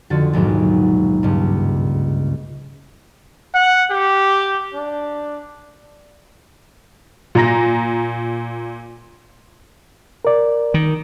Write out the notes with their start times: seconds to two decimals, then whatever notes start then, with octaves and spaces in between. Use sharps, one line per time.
0.10 F2 D3 F4 F#4 A6
0.33 A#1 D#2 G#2 B2 F#3
1.23 C#2 G2
3.55 F#5
3.91 G4
4.74 D4
7.35 A#2 A#5 A#6
10.25 A#4 D5
10.74 D#3